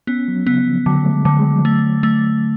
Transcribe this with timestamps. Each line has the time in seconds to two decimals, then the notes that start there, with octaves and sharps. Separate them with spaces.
0.07 B3 C#4
0.28 F#3
0.47 C#3 B3
0.67 F3
0.86 D3 F#3
1.04 A3
1.13 G#3
1.25 D3
1.39 G#3
1.58 F3
1.65 F#3 A3
2.03 A3